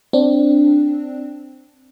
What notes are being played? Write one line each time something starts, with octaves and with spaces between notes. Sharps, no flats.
C4 D4